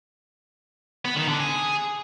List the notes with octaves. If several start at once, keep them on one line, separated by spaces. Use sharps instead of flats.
B3
D#3
D3
G#4